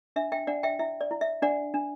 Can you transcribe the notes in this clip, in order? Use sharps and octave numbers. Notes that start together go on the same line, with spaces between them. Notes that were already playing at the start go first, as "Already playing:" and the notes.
D4 E5
E5 G5
D4 D5 F#5
E5 G5
E4 E5
D5
E4
E5
D4 D5 F#5
D4